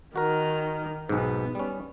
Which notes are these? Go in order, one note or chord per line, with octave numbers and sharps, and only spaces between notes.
D#3 F#4 A#4
B1 G#2 B3
G3 C#4